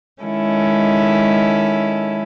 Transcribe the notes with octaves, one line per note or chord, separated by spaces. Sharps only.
D#3 G#3 C#4 E4 A4